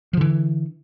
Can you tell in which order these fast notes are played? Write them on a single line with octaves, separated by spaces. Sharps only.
F3 D3 E3